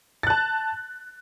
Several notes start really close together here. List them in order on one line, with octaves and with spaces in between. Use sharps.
A6 F#6 A5